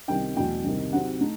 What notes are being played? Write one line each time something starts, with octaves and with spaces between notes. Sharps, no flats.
C2 C3 D#3 G5
E2 B2 F#3 A3 G5
C2 C3 D#3
C3 F#3 C4 D#4 F#5
A3 D#4